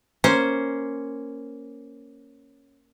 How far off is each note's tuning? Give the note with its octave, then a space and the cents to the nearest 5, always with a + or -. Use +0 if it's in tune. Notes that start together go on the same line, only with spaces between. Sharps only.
A#3 +0 C#4 +0 C5 -5